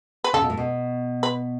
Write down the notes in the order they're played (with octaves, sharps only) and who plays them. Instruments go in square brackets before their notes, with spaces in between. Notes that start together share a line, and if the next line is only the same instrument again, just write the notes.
[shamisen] B4
[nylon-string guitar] C#3 [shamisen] A4
[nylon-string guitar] B2
A2
B2
[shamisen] B4